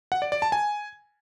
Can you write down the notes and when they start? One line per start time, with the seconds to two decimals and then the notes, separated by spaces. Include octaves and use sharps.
0.12 F#5
0.22 D5
0.32 D5
0.42 A5
0.52 G#5